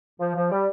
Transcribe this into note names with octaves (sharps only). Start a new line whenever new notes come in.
F3
F3
G3